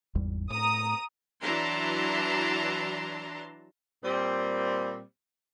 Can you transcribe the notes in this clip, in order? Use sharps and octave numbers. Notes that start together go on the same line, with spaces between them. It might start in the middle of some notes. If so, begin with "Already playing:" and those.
G#1 E2 G3
A2 A#5 D#6
E3 F#3 D4 A5 A#5 C6
A#2 G3 C4